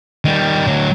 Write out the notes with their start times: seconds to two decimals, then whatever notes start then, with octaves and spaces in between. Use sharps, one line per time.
0.25 D#3 G3
0.67 D2 F#3